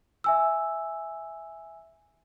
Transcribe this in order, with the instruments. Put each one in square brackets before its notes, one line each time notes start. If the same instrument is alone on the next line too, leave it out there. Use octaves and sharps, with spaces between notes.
[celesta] E5 G#5 E6